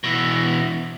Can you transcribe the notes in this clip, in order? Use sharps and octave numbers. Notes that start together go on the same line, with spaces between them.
B2 E3